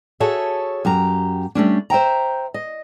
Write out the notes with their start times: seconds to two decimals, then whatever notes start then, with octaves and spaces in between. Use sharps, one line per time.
0.20 F#4 G#4 A4 C#5 E5
0.85 F#2 G4 A#5
1.55 G3 A3 C#4 D4
1.90 C5 E5 G5 A#5
2.54 D#5